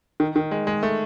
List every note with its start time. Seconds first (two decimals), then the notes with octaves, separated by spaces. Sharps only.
0.20 D#3
0.36 D#3
0.51 G#3
0.67 G#3
0.83 A3